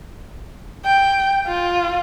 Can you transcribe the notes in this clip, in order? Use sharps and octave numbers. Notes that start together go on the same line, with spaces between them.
G5
F4